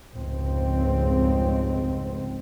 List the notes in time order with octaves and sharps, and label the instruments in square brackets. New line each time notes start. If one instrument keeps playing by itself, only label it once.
[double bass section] F1 C#2 G#2 C4